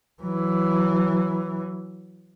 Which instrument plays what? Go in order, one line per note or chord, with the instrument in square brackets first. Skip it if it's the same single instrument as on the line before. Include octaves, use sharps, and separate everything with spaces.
[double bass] E3 F#3